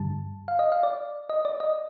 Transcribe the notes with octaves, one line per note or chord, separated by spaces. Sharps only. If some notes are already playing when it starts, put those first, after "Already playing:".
Already playing: G2 D3 G3 A5
F5
D#5
F5
D5
D#5
D5
D#5